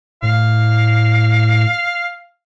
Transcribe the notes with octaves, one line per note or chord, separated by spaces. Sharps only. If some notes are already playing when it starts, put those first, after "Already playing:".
A2 F5